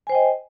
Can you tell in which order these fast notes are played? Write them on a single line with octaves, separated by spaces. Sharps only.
G#5 C5 G5 D#5